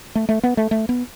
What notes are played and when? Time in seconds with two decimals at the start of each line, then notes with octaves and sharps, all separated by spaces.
0.15 A3
0.29 A3
0.43 B3
0.57 A3
0.71 A3
0.89 B3